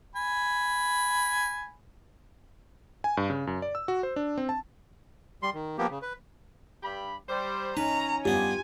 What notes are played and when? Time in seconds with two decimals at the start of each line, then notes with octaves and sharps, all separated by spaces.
0.16 G#5 B5
3.04 G#5
3.17 G2
3.30 C#3
3.47 F#2
3.62 D5
3.75 E6
3.88 F#4
4.03 C5
4.16 D4
4.38 C4
4.49 A5
5.43 G3 C6
5.54 D#3
5.78 F3 A#3 B3 G4
5.90 C#3
6.02 B4
6.83 G2 G4 B5
7.28 G3 C5
7.77 C#4 D#4 B4 A#5
8.25 G2 B3 F4 G4 G#5